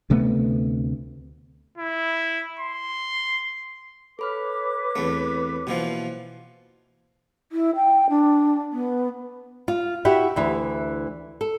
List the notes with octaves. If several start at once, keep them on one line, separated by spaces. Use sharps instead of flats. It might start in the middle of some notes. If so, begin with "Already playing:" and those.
D2 C3 A3 B3
E4
C6
A4 B4 C#5 B5 D6 F6
E2 A3 C4 A4
B2 E3 F3 A#3 C5
E4
G5
D4
B3
F4
E4 F#4 G4 E5
D2 E3
A4